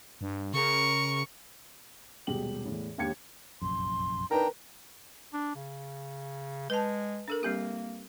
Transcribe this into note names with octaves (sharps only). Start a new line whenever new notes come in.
G2
C#3 A#4 C#6
D#1 B2 G#3 G4 F#7
E2 A2
E1 D#2 D4 G4 G#6 C#7
F1 A#1 F#2 C6
D4 D#4 A#4 B4 G5 A#5
D4
C#3
G#3 B4 A5
D4 A4 A#4
G3 A#3 C4 G4